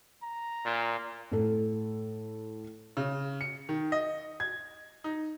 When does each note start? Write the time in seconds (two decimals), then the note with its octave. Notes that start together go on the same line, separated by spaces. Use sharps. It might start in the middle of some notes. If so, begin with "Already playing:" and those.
0.22 A#5
0.65 A#2
1.32 A2 A4
2.97 C#3
3.41 C#7
3.69 D#3
3.92 D#5
4.40 G#6
5.04 D#4